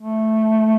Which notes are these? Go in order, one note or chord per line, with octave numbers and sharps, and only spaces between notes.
A3